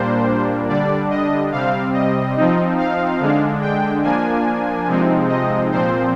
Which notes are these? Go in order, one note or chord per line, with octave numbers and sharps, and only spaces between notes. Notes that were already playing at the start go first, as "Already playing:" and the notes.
Already playing: A#2 G3 A#3 D4 C5
D3 G3 D4 D5
D#5
C3 G3 C4 F5
D#5
F3 C4 D#4
F5
D3 G#3 D4
G5
F3 A#3 D4 G#5
C3 F3 G#3 C4 D#4
D#5
A#2 F3 C4 C5